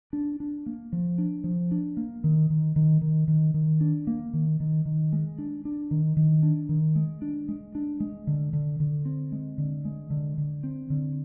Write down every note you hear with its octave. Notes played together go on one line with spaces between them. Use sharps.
D4
D4
A#3
F3
D4
F3
D4
A#3
D#3
D#3
D#3
D#3
D#3
D#3
D4
A#3
D#3
D#3
D#3
G#3
D4
D4
D#3
D#3
D4
D#3
G#3
D4
G#3
D4
G#3
D3
D3
D3
C4
G#3
D3
G#3
D3
D3
C4
D3